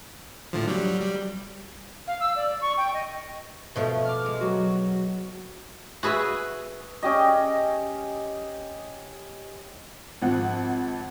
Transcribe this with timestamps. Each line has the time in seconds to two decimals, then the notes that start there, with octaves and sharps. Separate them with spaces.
0.53 A2 D3 F3
0.68 F#3 G3
1.00 G3
2.07 F5
2.20 E6
2.35 D5
2.61 C#6
2.77 G5
2.93 D#5
3.76 B2 F3 A3
4.05 D6 F6
4.26 G#3
4.41 F#3 F#4
6.03 F#4 G#4 B4 E5 G#5
7.03 C#4 G4 D#5
10.22 G#1 F3 F#5